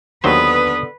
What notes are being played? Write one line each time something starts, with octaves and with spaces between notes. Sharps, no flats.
D#2 D3 F#3 B3 B4 C5 D#6